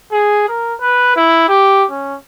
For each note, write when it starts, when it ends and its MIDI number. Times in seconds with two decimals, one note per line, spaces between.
0.12 0.47 68
0.49 0.74 70
0.80 1.12 71
1.16 1.45 64
1.48 1.84 67
1.91 2.16 61